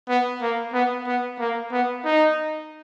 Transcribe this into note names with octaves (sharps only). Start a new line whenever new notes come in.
B3
A#3
B3
B3
A#3
B3
D#4